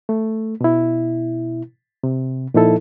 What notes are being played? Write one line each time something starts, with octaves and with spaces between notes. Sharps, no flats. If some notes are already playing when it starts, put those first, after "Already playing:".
A3
B2 E4
C3
A#2 F3 D#4 E4 A4